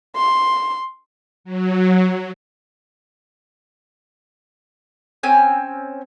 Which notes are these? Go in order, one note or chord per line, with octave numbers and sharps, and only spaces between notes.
C6
F#3
C4 C#4 G#5